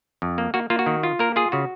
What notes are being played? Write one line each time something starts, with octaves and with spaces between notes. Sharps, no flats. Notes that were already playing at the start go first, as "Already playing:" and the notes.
F2
A#3
A#3 F#4
A#3 F4
F#4
D#3
F4
A#3 A#4
F4 G#4
C#3 F#4